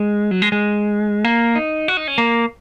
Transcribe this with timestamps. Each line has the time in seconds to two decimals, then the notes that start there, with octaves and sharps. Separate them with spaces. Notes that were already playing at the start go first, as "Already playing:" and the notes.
Already playing: G#3
0.31 F#3
0.42 G#3
0.52 G#3
1.24 A#3
1.55 D#4
1.88 F#4
1.97 D#4
2.08 C#4
2.18 A#3